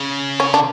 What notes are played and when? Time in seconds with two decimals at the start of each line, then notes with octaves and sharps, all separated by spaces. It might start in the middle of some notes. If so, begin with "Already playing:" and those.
Already playing: C#3
0.40 C#4
0.54 D4